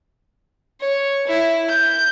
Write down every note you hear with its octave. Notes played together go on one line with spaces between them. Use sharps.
C#5
E4
G6